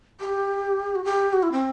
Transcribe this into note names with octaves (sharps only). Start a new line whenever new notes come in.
G4
F#4
G4
F#4
E4
C4